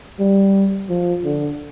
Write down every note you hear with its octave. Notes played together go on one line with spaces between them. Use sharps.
G3
F3
D3